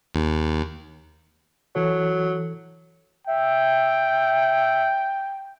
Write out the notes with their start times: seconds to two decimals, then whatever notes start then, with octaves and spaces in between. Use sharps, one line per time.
0.15 D#2
1.75 E3 F#3 A4 C#5
3.27 E5 G5